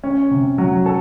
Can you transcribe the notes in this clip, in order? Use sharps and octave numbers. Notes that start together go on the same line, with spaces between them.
C#4
C3
F#3
A4